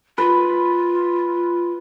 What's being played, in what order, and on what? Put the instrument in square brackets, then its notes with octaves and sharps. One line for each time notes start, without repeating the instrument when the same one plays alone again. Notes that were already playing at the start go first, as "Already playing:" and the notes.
[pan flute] F4 [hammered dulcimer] B4